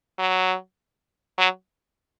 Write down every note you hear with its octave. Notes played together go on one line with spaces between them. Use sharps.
F#3
F#3